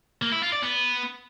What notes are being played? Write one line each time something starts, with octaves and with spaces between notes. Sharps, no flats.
A#3
E4
F4
D5
B3